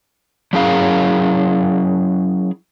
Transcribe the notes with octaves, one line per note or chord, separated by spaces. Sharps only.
F#3 C#4 E4 G#4 A#4 F5